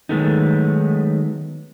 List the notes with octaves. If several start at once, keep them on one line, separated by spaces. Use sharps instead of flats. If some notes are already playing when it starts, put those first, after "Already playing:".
D#3 F#3 G#3 A3 B3 D#4